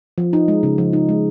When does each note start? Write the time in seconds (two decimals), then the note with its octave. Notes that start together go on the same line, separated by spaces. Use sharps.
0.18 F3
0.33 D#4
0.48 G#3
0.63 C#3
0.78 F3
0.93 D#4
1.09 G#3